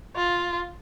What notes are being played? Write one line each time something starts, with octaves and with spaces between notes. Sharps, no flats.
F4